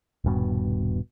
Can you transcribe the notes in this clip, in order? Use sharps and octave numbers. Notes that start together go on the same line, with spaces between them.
D#1 G2 B2